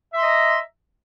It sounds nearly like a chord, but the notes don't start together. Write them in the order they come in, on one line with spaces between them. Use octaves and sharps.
E5 C6 D#5 A#5